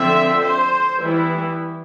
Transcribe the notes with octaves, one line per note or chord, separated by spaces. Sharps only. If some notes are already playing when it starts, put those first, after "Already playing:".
Already playing: D3 F3 C4 E5
C5
E3 G3 B3 E4